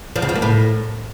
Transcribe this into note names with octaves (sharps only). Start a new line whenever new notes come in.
F3
C#3
F3
A#3
A2